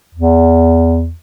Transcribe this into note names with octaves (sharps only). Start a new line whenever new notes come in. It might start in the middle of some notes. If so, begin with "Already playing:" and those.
E2